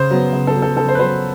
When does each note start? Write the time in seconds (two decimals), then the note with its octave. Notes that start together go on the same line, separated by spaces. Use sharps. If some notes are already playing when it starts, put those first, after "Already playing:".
Already playing: C#3 C5
0.11 F#3 B3
0.33 C#3
0.47 A4
0.55 F#3 B3
0.62 A4
0.77 C#3 A4
0.88 C5
0.95 B4
0.99 F#3 B3 C5